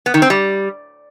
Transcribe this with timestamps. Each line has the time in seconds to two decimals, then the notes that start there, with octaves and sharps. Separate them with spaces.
0.06 B3
0.14 D#3
0.22 C4
0.30 G3